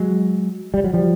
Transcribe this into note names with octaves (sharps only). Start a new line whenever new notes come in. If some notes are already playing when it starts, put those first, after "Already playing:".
Already playing: F#3 G#3
G3
F#3
F3 G3